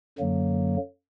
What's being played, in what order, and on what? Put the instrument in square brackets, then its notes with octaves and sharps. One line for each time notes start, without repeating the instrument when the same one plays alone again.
[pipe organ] F#2 D3 F#3 A#3